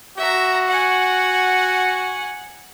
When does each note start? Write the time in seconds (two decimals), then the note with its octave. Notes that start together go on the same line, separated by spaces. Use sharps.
0.18 F#4 E5 A#5
0.68 F#5 G#5